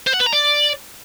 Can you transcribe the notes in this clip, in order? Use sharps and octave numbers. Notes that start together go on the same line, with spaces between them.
C5
F#5
B4
A#5
D5